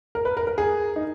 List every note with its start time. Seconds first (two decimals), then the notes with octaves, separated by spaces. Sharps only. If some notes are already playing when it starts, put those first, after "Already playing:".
0.15 A#4
0.25 B4
0.37 A#4
0.47 A#4
0.58 G#4
0.96 D#4